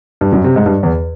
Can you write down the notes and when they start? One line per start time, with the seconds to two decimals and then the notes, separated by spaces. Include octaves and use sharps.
0.21 G2
0.32 F#2
0.44 C3
0.56 G#2
0.66 G2
0.83 E2